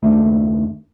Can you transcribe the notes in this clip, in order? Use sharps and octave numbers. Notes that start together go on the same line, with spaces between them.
F#1 D#2 A3 D4